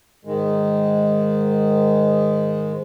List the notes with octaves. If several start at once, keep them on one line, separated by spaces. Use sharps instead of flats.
G#2 D#3 G#3